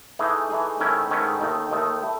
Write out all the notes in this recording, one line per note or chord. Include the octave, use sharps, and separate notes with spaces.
E3 A3 D#4 G#4
E3 A3 D#4 G#4
G#2 D#3 A3 C#4 E4
G#2 D#3 A3 C#4 E4
D#2 D#3 A3 D#4
D#2 D#3 A3 D#4
A3 E4